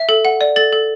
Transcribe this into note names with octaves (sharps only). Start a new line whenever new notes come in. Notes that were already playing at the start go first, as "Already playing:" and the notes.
Already playing: E5
A4
F#5
D5
A4 A6
A4